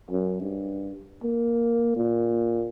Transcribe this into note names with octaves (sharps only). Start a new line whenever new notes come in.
F#2
G2
A#3
A#2